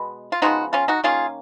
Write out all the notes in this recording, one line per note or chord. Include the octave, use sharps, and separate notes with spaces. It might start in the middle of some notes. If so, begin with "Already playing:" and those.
Already playing: B2 G#3 B3
F4
C#3 F3 G#3 B3 D#4 F#4
C#4 F4
D#4 F#4
D#3 A#3 C#4 F4 G#4